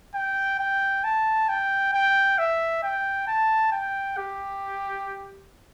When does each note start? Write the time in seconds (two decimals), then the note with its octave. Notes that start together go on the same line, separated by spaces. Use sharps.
0.14 G5
0.59 G5
1.04 A5
1.49 G5
1.93 G5
2.38 E5
2.83 G5
3.27 A5
3.72 G5
4.17 G4